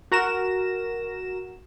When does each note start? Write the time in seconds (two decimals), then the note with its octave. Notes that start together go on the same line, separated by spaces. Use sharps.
0.12 F#4 A#4 A#6 E7